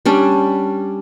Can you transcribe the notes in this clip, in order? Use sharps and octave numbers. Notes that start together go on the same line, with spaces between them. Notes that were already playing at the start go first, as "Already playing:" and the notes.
G3 C#4 D4